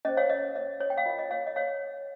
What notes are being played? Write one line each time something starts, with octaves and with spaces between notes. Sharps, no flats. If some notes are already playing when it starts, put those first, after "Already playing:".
C#4 G#4 C5 D#5
C#5 F5
D#5
D#5
C#5
G5
F5
F4 A#4 C#5 D#5
D#5
C#5 F5
D#5
C#5 F5